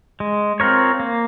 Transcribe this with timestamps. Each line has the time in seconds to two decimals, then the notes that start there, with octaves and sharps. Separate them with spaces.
0.20 G#3
0.60 C4 F4 A#4 C#5
1.00 A#3